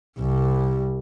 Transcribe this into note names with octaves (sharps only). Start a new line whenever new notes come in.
C2